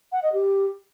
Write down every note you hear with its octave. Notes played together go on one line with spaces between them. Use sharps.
F#5
D#5
G4